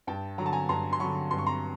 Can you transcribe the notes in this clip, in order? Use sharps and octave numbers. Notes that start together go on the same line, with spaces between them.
G2 G5 A5
D3 F#3 A#5
A5
G#5 A#5
G2 A#5 C6
C6
D3 F#3 B5 C#6
G2 C6
C#6
A#5 C6